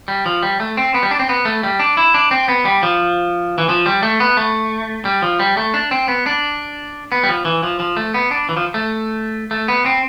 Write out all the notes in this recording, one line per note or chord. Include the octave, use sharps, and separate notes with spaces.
G3
F3
G3
A3
C4
B3
G3
D4
C4
B3
A3
G3
D4
E4
D4
C4
B3
G3
F3
E3
F3
G3
A3
B3
A3
G3
F3
G3
A3
D4
C4
B3
D4
B3
G3
F3
E3
F3
F3
A3
B3
D4
E3
F3
A3
A3
B3
C4